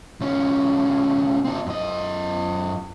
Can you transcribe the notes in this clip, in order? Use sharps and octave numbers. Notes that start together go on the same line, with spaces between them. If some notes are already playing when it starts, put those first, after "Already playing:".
C2 C#4
C4 D#4
F#2 D#5